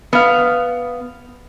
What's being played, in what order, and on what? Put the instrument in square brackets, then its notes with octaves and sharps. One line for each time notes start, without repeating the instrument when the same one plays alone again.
[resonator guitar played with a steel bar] B3 F5